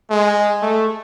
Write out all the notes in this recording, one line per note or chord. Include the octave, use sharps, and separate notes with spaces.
G#3
A3